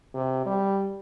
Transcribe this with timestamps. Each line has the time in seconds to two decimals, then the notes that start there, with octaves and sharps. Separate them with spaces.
0.14 C3
0.46 G3